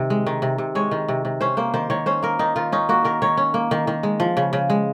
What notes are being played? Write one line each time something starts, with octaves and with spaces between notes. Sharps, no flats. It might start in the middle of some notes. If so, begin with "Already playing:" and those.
Already playing: C3 D#3
G#3
D#3
C3
C3
G#3 C#5
D#3
C3
C3
C#4 C5
A#3 C5
D#3 C5
D#3 C#5
C#4 C5
A#3 A#4
D#3 D#4
D#3 F4
C#4 D#4
A#3 F#4
D#3 A#4
D#3 C#5
C#4
A#3
D#3
D#3
G#3
F3
C#3
C#3
G#3